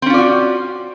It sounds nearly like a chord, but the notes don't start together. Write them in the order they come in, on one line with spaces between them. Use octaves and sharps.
C4 C#4 F4 D5 F#4